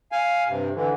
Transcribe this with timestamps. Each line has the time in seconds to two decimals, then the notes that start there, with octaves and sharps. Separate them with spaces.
0.12 F5 G#5
0.47 G2 C3
0.75 D3 E3